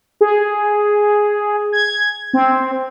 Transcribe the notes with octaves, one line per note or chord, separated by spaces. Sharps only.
G#4
G#6
C4